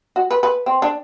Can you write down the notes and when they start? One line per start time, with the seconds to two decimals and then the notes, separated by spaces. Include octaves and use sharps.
0.16 F#4
0.31 B4
0.43 B4
0.66 C4
0.82 D4